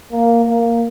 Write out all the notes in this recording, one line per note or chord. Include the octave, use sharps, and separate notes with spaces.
A#3
A#3